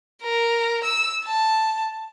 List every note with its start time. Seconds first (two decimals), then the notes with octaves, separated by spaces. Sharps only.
0.22 A#4
0.83 E6
1.25 A5